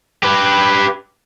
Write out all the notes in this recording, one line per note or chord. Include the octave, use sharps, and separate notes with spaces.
G4 B4